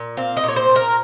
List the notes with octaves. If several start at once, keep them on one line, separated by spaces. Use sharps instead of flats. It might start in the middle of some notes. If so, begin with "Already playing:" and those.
Already playing: A#2
C4 F5
D#5
A#2
C#5
C5
A#2
A#4